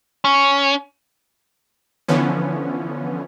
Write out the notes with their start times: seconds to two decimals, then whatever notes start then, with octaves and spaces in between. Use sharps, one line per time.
0.24 C#4
2.08 D3 E3 F3 B3 C#4